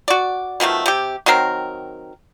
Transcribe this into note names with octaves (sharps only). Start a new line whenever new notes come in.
F#4 D5
B2 D#3 F3 A3
C3 G4
D#3 F#3 C4 A#4